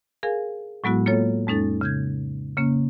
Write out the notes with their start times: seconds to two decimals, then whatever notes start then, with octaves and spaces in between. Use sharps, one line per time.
0.23 G#4 A#4 F5 G#5
0.84 A2 F#3 G#3 B3 E4 F#4
1.06 A#3 F4 A4 C#5
1.47 F2 G#3 C#4 D#4 A4 A6
1.81 C#3 G6 G#6
2.57 C#3 A#3 C#4